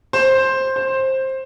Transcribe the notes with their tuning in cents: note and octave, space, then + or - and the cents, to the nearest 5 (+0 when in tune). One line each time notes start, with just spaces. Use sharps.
C5 +10
C5 +15